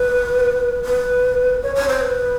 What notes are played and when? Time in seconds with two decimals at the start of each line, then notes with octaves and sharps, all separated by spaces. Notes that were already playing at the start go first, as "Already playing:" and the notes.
Already playing: B4
0.85 B4
1.63 C#5
1.75 C#5
1.89 C5
2.01 B4